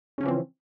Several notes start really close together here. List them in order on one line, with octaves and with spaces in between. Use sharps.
C#3 C#4 F3 E3 C4